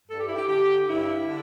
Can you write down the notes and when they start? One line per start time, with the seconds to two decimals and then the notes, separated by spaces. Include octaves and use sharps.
0.08 G2 A4
0.18 G4
0.27 E4
0.36 G4
0.48 D3 G4
0.86 G2 E4
1.26 D3